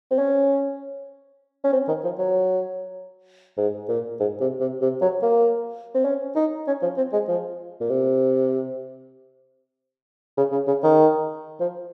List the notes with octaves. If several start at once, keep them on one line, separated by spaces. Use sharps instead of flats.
C4
C#4
C#4
C4
D#3
F3
F#3
G#2
A#2
G#2
C3
C3
C3
F#3
A#3
C4
C#4
D#4
C#4
F3
C4
G#3
F3
A#2
C3
C#3
C#3
C#3
D#3
F3